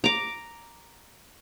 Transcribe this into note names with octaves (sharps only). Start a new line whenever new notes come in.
A#5 D6